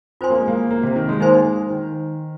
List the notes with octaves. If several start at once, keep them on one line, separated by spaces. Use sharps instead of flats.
C4 F4 C5 G#5 C6
A#3
G#3
A#3
A#3
C3
D#3
G#3
A#3 D#4 C5 G#5 C6
G#3
D#3